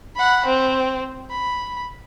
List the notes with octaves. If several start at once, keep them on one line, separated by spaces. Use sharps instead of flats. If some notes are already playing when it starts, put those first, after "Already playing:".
F#5 B5
C4
B5